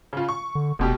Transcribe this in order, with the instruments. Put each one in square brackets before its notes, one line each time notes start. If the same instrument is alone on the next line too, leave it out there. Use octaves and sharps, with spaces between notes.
[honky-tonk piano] C#3 F4
C#6
[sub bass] D3
[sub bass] E1 [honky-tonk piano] D2 B2 G4